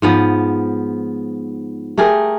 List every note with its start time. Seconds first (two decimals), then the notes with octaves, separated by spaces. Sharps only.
0.02 G#2 F3 B3
1.98 A3 G4 G#4 A#4